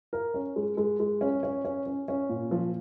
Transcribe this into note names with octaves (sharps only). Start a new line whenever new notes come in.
A#4
C#4
G#3
G#3
G#3
C#4
C#4
C#4
C#4
C#4
A#2
F3